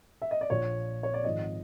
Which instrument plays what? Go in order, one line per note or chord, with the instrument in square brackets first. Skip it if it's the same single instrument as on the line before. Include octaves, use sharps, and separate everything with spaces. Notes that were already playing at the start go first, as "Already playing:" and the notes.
[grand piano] E5
D#5
D5
A#1 A#2 F3 C#5
C#5
D5
G#1 G#2 F3 D#5